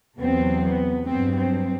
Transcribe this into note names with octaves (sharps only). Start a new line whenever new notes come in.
E2 C3 F#3 B3 C4
B3
G2 F#3 B3 C4
C4